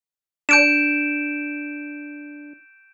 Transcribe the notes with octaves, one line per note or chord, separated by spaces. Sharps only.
D4 G6 D7 E7